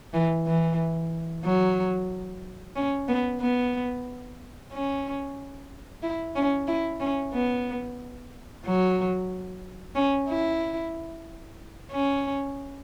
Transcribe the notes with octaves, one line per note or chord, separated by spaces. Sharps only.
E3
E3
F#3
C#4
B3
B3
C#4
E4
C#4
E4
C#4
B3
F#3
C#4
E4
C#4